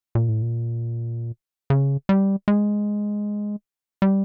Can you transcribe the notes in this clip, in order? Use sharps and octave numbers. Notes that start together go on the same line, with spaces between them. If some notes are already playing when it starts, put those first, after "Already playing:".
A#2
A2
A#2
C#3
G3
G#3
G3